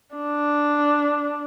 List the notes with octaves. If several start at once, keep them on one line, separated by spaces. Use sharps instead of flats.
D4